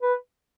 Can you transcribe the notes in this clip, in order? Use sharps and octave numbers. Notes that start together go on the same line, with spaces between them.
B4